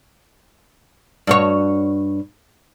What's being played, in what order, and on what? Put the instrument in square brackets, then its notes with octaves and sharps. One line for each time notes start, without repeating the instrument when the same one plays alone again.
[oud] G2 F#4 C#5